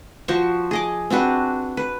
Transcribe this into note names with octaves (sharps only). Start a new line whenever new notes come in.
F3 F#4 C5 C#6
G#4 D#5 D6
C4 D4 F#4 B4
B4